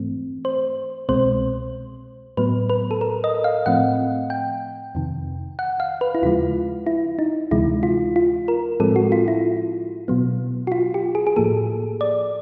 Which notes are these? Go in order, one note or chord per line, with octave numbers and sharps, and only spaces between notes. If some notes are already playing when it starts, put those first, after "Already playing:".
Already playing: G#2 E3 A3 C4
C5
C2 B2 G#3 C4 C5
A2 F#3 B3 B4
B4
A4
A#4
D#5
F5
A2 F3 A3 C4 F#5
G5
F2 C3 D#3
F#5
F5
B4
E4
D#2 C#3 F3 G#3 F4
E4
D#4
D2 C3 E3 G#3 E4
F4
F4
A#4
A2 F3 G#3 C4 A4
F#4
F4
E4
B2 F#3 B3
F#4
F4
G4
G#4
G#4
A2 F3 A#3 A4
D5